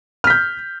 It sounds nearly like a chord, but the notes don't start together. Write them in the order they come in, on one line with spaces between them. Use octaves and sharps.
F6 B6 G6